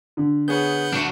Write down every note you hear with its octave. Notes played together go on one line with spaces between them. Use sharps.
D3
B3 G#4 B4 C#5 F#5 G6
D4 F#4